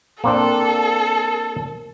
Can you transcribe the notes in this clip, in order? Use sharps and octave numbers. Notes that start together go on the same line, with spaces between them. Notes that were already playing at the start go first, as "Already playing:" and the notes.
A#3 C4 D4 A4 A#4